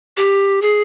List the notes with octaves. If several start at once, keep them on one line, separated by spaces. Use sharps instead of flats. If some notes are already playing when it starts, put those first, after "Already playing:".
G4
G#4